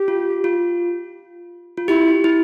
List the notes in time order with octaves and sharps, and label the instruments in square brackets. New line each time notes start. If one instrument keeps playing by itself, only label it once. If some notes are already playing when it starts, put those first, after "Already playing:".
Already playing: [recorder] G4
[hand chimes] F4
F4
F4
[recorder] E4 [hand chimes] G4
[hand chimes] E4